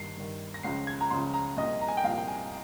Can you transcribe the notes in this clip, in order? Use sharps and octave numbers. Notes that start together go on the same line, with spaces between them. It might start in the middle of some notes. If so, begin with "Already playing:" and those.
Already playing: G2 D#3 C7
G2 D#3
A#6
C#2 C#3 F3 C7
G#6
A#5
C#2 C#3 F3 C6
A#5
C2 A#2 F3 D#5
A#5
G#5
G5
C2 A#2 F3 F5
G5
G#5